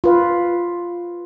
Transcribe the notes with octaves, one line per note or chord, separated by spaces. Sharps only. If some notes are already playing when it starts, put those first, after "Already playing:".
F4 B4 F5